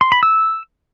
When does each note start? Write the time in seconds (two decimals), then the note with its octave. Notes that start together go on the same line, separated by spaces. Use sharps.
0.01 C6
0.12 B5
0.23 E6